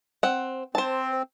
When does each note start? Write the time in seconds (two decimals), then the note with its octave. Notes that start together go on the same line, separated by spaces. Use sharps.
0.23 C4 F#5
0.75 C4 C5 A5